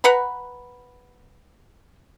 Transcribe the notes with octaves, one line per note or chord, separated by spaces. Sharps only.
B4 F#5 A#5 B5